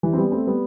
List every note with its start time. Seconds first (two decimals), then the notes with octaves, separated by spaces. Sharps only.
0.03 E3 G3
0.13 C4
0.17 G3 B3
0.32 A3 C4
0.47 G3 B3